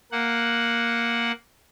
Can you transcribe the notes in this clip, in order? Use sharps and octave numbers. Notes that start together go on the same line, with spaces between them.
A#3 F#5